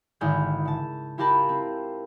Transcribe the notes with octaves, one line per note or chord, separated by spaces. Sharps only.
G#1 D3 E4 G#4 F6 G6
C#3 A5
E4 F4 G4 A#4 A5 B5
C4